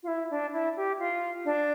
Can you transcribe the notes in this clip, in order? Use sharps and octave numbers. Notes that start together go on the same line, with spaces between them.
F4
E4
D4
E4
G4
F4
D4